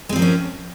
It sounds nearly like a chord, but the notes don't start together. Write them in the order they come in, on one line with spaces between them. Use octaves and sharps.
G#3 C4 F3 A#4 C#4